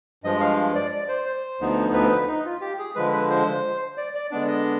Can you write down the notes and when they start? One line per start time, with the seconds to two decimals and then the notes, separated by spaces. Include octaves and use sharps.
0.24 G2 F3 G#3 D#5
0.41 F5
0.75 D5
0.92 D5
1.09 C5
1.26 C5
1.61 D2 D3 F3 B3 D#4
1.94 B4
2.27 D#4
2.45 F4
2.61 G4
2.79 G#4
2.95 D3 F3 G#3 B4
3.12 B4
3.30 C5
3.98 D5
4.15 D5
4.31 D3 G#3 B3 D4 D5
4.48 D#5